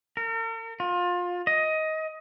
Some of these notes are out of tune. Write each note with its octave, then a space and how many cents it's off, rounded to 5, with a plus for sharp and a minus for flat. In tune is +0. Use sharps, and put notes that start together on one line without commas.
A#4 -45
F4 +25
D#5 +15